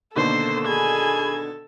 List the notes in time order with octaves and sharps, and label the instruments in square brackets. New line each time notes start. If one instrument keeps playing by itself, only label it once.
[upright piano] B2 D3 D#3 [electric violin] A#3 C5 [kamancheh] A4
[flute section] G#4 G#5 B5 [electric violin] G#6